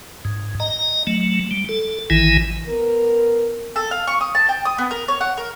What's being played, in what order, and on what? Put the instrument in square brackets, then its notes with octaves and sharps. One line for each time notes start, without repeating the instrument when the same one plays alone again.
[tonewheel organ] G#2
D#5 A#5
F#3 A3
G3
A4
A1 D#3 E3 E4 G#5
[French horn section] B3 A#4
[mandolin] A4
F5
C#6
D#6
A5
G5
D#6
B3
A#4
C#5
F#5
A#4